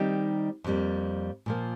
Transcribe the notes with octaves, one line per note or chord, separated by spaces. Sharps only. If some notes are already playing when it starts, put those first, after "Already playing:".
Already playing: D#3 G3 C4 D#4 G4
F2 D#3 G3 A#3
A#2 F3 A#3